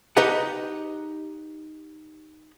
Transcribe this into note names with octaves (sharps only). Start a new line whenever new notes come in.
D#4 G4 B4 D#5 F#5